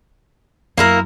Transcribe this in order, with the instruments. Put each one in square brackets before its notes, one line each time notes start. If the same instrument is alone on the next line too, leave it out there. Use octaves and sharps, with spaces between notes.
[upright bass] F#2 [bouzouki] A#3 E4 A#4